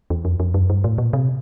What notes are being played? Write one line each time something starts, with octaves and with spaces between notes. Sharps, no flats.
E2
F2
F2
F#2
G2
A2
A#2
C3